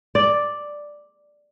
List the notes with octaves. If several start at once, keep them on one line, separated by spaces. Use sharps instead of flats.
D5